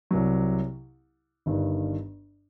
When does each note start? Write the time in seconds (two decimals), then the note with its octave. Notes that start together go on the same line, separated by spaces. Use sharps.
0.11 C2 C3 F#3
1.46 G1 G2 D#3